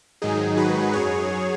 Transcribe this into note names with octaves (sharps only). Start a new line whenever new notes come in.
G#2 D#3 F#3 D#4 G#4
F#4 B4
F#2 F#3 G#4 C#5